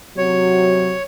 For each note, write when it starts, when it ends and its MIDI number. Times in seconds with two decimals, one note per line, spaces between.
0.17 0.94 48
0.17 0.94 54
0.17 1.02 73